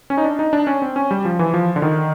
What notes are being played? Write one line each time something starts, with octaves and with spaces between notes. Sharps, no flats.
C#4
D#4
D4
D#4
D4
C#4
C4
C#4
G3
F3
E3
F3
D3
D#3